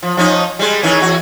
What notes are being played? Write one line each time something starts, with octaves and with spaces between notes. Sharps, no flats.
F3
F3 C#4 D#4
G3 G#3
D#3 E3 C#4
E2 F#4